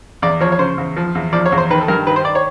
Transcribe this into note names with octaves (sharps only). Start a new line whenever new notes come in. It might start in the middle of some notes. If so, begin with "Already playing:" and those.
E2 D5
F3 C#5
C#5
C#3 C5
E2
F3
E2
F3 D5
C#5
E2
C5
D#3 B4
A4
G2 A#4
D#3 B4
C5
D5
C#5